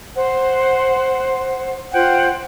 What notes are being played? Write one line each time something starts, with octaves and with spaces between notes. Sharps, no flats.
C5 F#5
F4 C5 F#5 G5